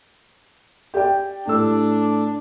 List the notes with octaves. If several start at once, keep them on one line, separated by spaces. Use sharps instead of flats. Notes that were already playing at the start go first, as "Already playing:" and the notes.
G4 D5 G5
A2 D4 E6